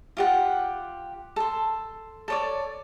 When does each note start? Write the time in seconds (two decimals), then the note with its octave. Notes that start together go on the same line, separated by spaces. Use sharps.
0.17 F4 G4 F#5
1.36 A4 C6
2.28 A4 C#5 D5